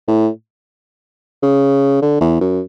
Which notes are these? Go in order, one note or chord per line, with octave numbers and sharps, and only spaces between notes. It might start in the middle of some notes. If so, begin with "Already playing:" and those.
A2
C#3
D3
E2
F#2